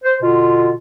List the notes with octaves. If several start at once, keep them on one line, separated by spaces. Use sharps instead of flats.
C5
B2 D3 F4